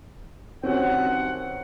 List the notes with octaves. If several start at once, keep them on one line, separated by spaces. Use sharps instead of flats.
G2 D#3 C4 C#4 F#4 F#5